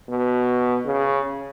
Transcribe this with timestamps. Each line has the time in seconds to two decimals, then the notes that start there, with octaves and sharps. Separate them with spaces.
0.09 B2
0.86 C#3